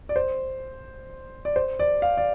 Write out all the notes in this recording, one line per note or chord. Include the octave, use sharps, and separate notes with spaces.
D5
C5
D5
C5
D5
F5
D5